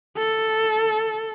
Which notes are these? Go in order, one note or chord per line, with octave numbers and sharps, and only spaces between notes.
A4